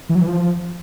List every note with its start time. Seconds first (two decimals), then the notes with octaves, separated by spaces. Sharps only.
0.09 E3
0.15 F#3
0.21 E3
0.27 F3